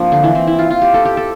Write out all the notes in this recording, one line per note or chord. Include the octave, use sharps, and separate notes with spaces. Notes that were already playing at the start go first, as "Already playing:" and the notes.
Already playing: F3 A#3 C4 D4
D3
E3
C4
E4
F4
F4
G4
A4
G4
A4